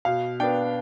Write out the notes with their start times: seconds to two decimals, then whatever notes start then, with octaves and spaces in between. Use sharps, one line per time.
0.05 B2 F5
0.40 B3 D4 G5